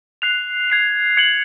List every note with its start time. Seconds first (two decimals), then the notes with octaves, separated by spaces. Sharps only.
0.22 F#6 C7 F7
0.70 G#6 C7 F7
1.17 G#6 C#7 F#7